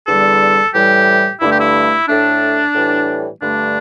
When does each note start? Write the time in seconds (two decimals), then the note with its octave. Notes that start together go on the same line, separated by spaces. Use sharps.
0.07 E2 D3 G3 A4
0.74 A2 E3 G3 G4
1.41 G2 D3 A3 E4
1.51 G4
1.60 E4
2.08 A2 A3 D4
2.75 A2 E3 G3
3.41 G2 D3 A3 D4